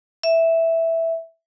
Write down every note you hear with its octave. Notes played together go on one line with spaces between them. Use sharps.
E5